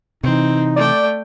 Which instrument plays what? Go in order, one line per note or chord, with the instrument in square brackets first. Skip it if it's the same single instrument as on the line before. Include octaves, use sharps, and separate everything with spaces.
[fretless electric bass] C3 E3 [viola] C4 [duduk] D#4
[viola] A3 G5 [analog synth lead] D5